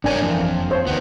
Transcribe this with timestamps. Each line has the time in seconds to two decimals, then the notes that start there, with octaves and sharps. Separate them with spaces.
0.04 G1 G#2 D4 A#4 C#5 G#5
0.21 G1 F2 E3 A#3
0.53 F#1
0.71 C5 C#5
0.87 D2 D#3 B3